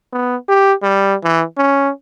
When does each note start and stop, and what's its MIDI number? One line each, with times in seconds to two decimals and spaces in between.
0.13 0.36 59
0.49 0.73 67
0.83 1.15 55
1.24 1.44 52
1.58 1.91 61